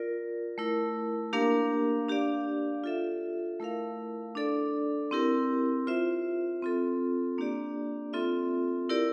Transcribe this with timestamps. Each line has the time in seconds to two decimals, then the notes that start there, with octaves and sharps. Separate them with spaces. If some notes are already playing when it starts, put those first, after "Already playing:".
Already playing: F4 A#4 D5
0.58 A3 E4 A#4
1.33 A#3 D4 G4 A#4 F5
2.08 D4 G4 D5 F5
2.84 F4 A4 E5
3.60 A3 E4 A#4 F5
4.35 D4 A4 D5
5.11 C4 E4 G4 A#4
5.87 F4 C5 E5
6.62 C4 F4 A4
7.38 A#3 D4 G4 D5
8.13 C4 F4 A4 E5
8.89 E4 G4 A#4 D5